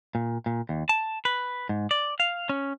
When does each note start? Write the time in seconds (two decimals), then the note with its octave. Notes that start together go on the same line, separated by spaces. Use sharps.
0.15 A#2
0.46 A#2
0.69 D#2
0.89 A5
1.25 B4
1.69 G#2
1.91 D5
2.20 F5
2.49 C#4